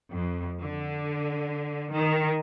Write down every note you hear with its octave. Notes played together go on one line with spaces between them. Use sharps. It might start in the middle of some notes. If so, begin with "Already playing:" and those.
F2
D3
D#3